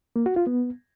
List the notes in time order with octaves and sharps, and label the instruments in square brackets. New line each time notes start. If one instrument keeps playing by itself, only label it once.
[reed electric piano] A#3
F#4
F4
B3